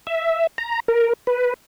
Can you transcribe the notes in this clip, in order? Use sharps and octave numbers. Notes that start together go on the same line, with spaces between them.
E5
A#5
A#4
B4